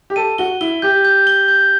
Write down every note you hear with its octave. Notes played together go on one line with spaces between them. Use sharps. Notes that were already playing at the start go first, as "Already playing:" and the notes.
G4
A4 D#7
F#4 G7
E4 G7
G4 G6
G6
G7
G6